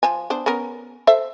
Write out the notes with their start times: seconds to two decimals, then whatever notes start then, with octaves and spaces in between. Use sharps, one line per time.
0.03 F3 C5 G#5
0.30 B3 D4 C5
0.46 B3 C#4 A#4
1.07 A4 C5 E5